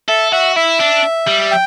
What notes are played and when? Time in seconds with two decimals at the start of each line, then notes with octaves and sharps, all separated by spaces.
0.09 A4 E5
0.32 F#4 E5
0.56 E4 E5
0.80 D4
1.27 G3
1.51 G5